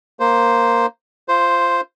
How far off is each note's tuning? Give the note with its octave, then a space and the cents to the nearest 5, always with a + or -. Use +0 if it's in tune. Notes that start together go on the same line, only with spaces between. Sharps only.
A#3 +0 C5 +0
F4 -20 C5 +0